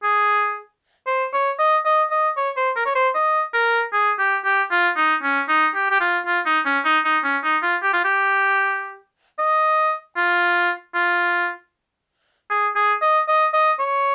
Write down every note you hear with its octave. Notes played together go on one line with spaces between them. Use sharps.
G#4
C5
C#5
D#5
D#5
D#5
C#5
C5
A#4
C#5
C5
D#5
A#4
G#4
G4
G4
F4
D#4
C#4
D#4
G4
G4
F4
F4
D#4
C#4
D#4
D#4
C#4
D#4
F4
G4
F4
G4
D#5
F4
F4
G#4
G#4
D#5
D#5
D#5
C#5